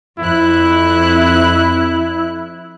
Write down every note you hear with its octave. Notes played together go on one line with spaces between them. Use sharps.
F2 E4 F#6